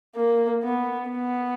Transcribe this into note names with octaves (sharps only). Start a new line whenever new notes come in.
A#3
B3
B3